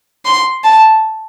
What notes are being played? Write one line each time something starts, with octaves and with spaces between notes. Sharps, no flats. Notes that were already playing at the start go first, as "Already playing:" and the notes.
C6
A5